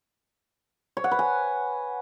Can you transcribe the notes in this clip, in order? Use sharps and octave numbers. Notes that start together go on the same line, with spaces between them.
C#5
F#5
B4
G#5